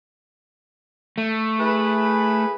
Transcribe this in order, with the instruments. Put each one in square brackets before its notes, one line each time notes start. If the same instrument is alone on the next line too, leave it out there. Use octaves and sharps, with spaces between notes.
[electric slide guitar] A3
[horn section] E4 G#4 B4